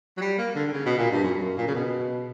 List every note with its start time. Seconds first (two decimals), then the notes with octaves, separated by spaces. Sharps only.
0.17 F#3
0.21 G3
0.38 A#3
0.55 D3
0.68 D3
0.73 C#3
0.86 B2
0.98 A#2
1.11 G2
1.24 F#2
1.41 F#2
1.58 A#2
1.68 C#3
1.75 B2